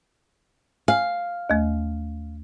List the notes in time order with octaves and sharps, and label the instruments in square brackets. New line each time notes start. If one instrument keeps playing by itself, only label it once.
[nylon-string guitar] F5 [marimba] G#5
[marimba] D#2 A3